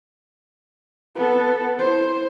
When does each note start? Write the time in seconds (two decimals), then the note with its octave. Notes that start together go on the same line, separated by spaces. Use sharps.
1.16 B3 A4
1.79 E4 C5